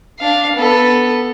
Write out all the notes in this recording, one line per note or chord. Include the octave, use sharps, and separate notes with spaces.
D4 F5
B3 A4